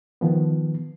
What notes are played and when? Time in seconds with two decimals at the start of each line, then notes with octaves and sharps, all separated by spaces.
0.21 D#3 F3 B3